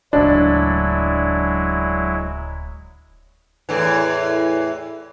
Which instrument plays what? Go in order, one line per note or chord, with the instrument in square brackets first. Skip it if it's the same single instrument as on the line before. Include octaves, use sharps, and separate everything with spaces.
[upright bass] D1 C#3 [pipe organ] F#3 G#3 E4 [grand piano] D4
[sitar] E2 A2 E3